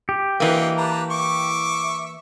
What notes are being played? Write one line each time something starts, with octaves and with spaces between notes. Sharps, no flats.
G4
E3 A#3 C4 F#4 D#5
B4 A5 A#5
E5 C#6 D6